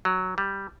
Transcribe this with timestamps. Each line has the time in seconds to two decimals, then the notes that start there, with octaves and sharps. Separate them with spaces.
0.05 F#3
0.38 G3